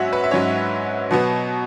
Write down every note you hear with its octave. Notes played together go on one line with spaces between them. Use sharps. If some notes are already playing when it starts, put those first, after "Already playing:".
Already playing: G#2 F#3 C#4 F#4 C#5 E5
B4
E5
G#2 F#3 C#4 C#5
B2 F#3 B3